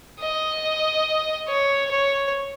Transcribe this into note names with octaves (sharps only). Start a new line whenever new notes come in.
D#5
C#5
C#5